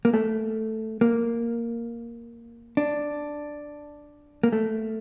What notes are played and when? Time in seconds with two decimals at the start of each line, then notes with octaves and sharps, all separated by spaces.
0.05 A#3
0.14 A3
1.01 A#3
2.77 D4
4.43 A#3
4.52 A3